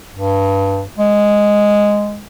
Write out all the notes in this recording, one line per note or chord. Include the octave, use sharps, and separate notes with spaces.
G2
G#3